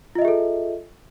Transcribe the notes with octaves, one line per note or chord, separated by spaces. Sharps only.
F4 G#4 A4 D#5 E5